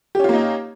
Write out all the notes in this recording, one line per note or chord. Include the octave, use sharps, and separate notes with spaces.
A#3 C#4 D#4 F4 G4